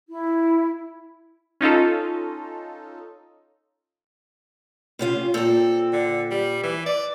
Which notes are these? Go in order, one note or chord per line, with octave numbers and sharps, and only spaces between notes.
E4
C#4 D#4 F4 A4
C3 C#4 F4
A#2 C4 A4
D3
G3
E3
D5